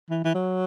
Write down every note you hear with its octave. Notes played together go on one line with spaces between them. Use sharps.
E3
E3
F#3